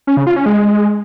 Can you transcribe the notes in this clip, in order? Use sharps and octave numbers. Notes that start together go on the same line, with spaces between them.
C#4
C#3
F4
C#4
G#3